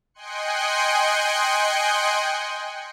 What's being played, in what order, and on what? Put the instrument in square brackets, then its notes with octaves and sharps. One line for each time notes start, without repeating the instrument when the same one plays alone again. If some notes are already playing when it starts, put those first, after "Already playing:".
[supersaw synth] D#5 G5 G#5 C6 F#6 C#7